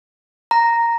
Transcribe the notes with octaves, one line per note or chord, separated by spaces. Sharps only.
A#5